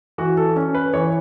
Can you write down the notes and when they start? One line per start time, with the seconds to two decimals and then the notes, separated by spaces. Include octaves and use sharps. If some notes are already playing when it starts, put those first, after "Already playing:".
0.18 E3 F#4
0.37 A4
0.56 C#4
0.75 B4
0.93 E3 C#5